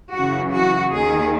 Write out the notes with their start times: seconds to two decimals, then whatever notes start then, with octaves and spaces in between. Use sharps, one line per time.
0.14 F#2 C#3 E3 F#4
0.53 F#4
0.92 D#2 D#3 G#4